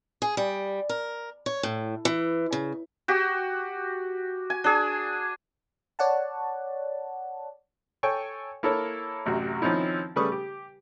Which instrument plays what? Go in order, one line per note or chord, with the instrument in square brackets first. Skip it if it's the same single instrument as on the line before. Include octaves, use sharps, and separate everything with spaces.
[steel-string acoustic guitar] G#4
G3
A#4
C#5
A2
E3
C#3
[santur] F#4 G4
G#5
D4 G#4
[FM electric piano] C#5 D5 F#5 A5
[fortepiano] A4 C#5 G5 G#5 C#6
A#3 E4 A4 A#4 C#5
A1 F#2 C3 F#4
D#3 F3 C4 C#4 D#4 E4
C#3 G3 A3 B4 C#6 D#6
G4